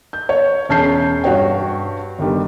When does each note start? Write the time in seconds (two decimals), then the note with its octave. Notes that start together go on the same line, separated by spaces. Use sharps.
0.13 G6
0.29 C#5
0.69 E1 C#4 A5 G6 C7
1.24 G2 F#4 C#5 G5
2.19 G1 D#3 G3